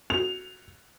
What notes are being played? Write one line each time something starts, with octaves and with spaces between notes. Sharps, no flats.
C4 F#4 F7